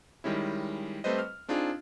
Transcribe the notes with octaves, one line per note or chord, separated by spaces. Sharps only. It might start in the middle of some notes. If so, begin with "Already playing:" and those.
D#3 G3 G#3 C#4 E4
G3 A3 C4 B4 C5 D#5
F6
C4 D4 D#4 F4 G#4